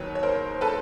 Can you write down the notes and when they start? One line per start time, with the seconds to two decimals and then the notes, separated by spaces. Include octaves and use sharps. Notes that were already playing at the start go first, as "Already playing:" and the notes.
Already playing: D#2 D#3 F#3 B4 C#5
0.15 C#5
0.23 A#4 C5
0.61 A4 B4